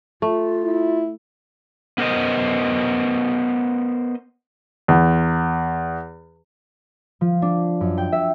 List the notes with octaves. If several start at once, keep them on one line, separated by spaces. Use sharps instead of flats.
A3 F4
E4
B3 A#4 C5 D#5
E2
F3
D4
F#2
G5
E5